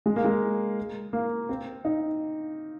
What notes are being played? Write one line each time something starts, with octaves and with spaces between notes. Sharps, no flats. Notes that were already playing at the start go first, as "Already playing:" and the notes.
G#3
A#3
G#3
A#3
C4
D#4